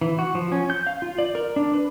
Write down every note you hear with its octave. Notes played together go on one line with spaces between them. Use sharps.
E3
F#4
F3
C#4
G6
F5
F4
D5
A#4
D4
B4